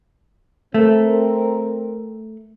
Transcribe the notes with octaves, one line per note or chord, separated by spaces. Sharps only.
A3 C4 A#4